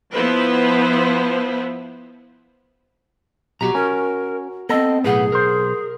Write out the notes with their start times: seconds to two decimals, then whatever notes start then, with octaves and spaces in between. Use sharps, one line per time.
0.14 F3 B3 E4 B4 C5
3.61 B1 B2 F#4 G4 A#5
3.75 C#4 A#4
4.69 B3 C4 A4 D#5
5.04 B1 A2 G#4 B4 F#5
5.32 B1 A#4 C5